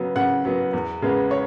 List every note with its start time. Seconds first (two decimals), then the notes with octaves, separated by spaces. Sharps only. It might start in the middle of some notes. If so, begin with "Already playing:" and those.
Already playing: C#3 F#3 B3
0.16 C#3 F#5
0.45 F#3 B3
0.73 E2
1.02 C#3 G#3 B3
1.31 C#5